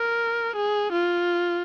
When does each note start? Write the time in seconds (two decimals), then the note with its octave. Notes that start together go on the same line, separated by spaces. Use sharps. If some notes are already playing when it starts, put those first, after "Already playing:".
Already playing: A#4
0.56 G#4
0.92 F4